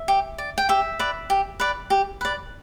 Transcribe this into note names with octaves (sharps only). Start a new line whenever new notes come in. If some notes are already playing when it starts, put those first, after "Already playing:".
Already playing: E5
G4
D5
G5
G4 E5
B4 D5
G4
B4 D5
G4
B4 D5